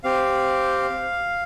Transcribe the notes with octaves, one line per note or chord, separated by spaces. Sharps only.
C4 G4 F5